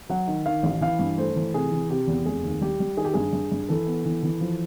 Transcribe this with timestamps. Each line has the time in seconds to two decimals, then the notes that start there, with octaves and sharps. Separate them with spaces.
0.09 F#3 F#5
0.27 D#3
0.46 D#3 F5
0.63 A1
0.81 E3 F5
0.99 G2
1.17 A3 C5
1.36 E3
1.54 C3 G#4
1.71 E3
1.89 C3 G4
2.07 E2
2.26 F1 G#4
2.43 D#2
2.61 G3 G4
2.80 G3
2.97 D#3 G#4
3.05 G4
3.14 G2 G#4
3.33 G2
3.52 G2
3.69 E3 A4
3.87 B3
4.05 E3
4.23 E3
4.41 F3